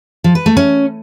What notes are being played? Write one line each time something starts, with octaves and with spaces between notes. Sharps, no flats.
F3
B4
A3
C#4